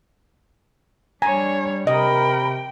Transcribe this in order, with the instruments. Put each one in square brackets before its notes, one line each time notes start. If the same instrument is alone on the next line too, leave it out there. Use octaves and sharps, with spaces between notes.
[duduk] G3 [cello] D4 C#5 [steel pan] G#5 A#5
[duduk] C3 [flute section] A#4 B5 [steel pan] D#5 [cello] G5